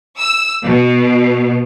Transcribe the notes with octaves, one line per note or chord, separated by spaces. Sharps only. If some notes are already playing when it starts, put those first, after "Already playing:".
E6
B2